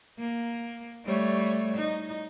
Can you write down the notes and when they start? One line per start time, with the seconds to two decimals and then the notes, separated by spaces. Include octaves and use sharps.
0.19 A#3
1.05 G3 A3 C#5
1.77 D#4